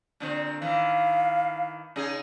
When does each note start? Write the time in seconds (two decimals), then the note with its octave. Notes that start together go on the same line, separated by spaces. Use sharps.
0.20 A#2 D3 C4
0.62 D#3 E3 F5
1.96 C#3 D#4 G#4